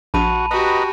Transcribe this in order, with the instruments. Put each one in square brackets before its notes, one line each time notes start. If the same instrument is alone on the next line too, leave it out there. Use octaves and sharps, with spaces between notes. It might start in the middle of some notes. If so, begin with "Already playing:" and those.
[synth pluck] A#1 [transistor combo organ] F#4 [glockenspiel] A5 B5 D#7
[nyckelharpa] F#4 G4 [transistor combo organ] B4 D#5 A#5